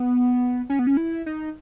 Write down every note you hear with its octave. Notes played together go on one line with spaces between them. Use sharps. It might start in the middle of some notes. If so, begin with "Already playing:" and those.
Already playing: B3
C#4
B3
C#4
E4
D#4